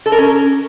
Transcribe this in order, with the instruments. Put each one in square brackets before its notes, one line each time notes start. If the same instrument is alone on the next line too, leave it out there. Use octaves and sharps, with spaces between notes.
[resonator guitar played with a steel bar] A4
A#4
C#4